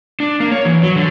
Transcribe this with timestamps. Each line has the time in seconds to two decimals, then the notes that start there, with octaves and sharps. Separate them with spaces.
0.20 D4
0.40 A#3
0.52 C#5
0.65 E3
0.83 F#3
0.96 D3